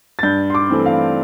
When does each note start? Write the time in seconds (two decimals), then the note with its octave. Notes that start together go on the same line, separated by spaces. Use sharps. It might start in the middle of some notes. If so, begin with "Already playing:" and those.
0.19 A6
0.23 G2 G6
0.50 C6
0.54 D6
0.70 E3 A3 C4
0.86 F5